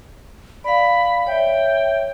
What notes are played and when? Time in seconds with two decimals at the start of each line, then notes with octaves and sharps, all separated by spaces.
0.64 D5 F5 B5
1.27 C#5 E5 G5